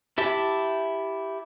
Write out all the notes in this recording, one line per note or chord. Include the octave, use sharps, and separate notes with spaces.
E4 G4 E5 A5